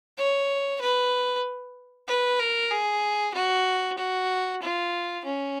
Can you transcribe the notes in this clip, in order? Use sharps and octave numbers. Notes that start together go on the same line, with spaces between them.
C#5
B4
B4
A#4
G#4
F#4
F#4
F4
C#4